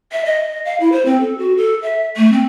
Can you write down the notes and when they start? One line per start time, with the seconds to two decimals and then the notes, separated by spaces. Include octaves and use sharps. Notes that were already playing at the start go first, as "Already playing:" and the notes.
0.12 E5
0.25 D#5
0.65 F5
0.80 E4
0.92 C5
1.05 C4
1.20 A4
1.38 F#4
1.57 A4
1.82 E5
2.16 A3
2.32 C4